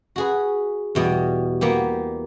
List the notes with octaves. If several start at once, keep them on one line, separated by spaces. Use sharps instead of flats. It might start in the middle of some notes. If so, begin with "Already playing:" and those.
F#4 G#4 B4
E2 B2 G3
A#3 B3 G4